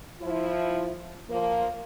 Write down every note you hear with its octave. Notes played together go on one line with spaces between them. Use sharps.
F3 E4
F3 A#3